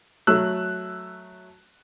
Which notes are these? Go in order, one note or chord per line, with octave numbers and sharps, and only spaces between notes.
F#3 A3 E6 F#6